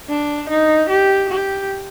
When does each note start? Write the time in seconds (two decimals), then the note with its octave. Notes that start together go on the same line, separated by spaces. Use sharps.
0.09 D4
0.49 D#4
0.89 G4
1.29 G4